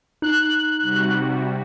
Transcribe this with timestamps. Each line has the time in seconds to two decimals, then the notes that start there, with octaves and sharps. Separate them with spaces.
0.22 D#4 F#6
0.81 C3 G3 F#4